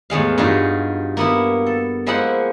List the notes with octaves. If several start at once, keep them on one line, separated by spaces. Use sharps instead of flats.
E2 A2 G#3 F5
G2 D#4 F4 F#4 G#4
A#3 B3 E4
A4
F3 G#3 A#3 E4 C5 F#5